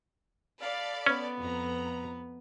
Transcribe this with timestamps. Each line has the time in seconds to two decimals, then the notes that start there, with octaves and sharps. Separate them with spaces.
0.61 A4 D5 F5 B5
1.06 B3 C#4 B4
1.40 F2 A#5